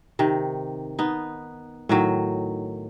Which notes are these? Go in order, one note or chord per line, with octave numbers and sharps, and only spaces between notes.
C3 D#3
B3 D#4
A2 D#3 F#3